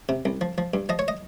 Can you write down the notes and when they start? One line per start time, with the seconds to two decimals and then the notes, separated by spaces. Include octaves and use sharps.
0.09 C3
0.25 C2
0.41 F3
0.58 F3
0.74 G2
0.89 F3 D#5
0.99 C#5
1.08 D#5